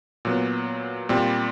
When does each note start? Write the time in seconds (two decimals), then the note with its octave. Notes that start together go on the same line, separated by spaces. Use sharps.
0.25 A#2 F#3 B3
1.09 A#2 G3 C4